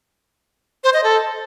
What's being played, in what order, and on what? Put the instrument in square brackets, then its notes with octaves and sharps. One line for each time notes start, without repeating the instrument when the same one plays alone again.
[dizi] C5
D#5
A4